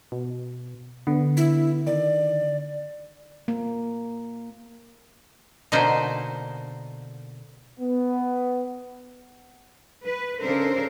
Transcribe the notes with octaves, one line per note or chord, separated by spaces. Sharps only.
B2
D3 B3
E4
D#3 D5
A#3
B2 D3 A#3 D#4 C5
B3
B4
C#3 D4 A4 A#4 C5